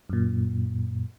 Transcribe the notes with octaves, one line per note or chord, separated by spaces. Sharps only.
F#2 A#2